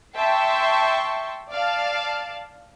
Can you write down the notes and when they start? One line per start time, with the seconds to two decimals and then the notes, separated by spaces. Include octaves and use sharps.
0.16 E5 G5 A5 C6 C#6
1.51 D5 F5 A5